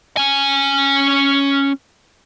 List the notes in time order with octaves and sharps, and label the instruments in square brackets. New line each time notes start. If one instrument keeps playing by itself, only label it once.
[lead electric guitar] C#4 G#5